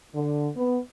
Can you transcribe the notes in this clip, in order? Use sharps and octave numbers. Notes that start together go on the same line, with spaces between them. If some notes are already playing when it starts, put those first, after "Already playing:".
D3
B3